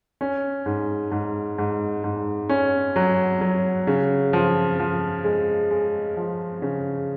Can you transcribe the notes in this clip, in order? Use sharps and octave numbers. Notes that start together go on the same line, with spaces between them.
C#4
G#2
G#2
G#2
G#2
C#4
F#3
F#3
C#3
F3
F3
G#3
G#3
F3
C#3